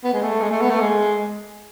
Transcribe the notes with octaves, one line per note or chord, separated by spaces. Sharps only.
B3
G#3
A3
G#3
A3
B3
A3
G#3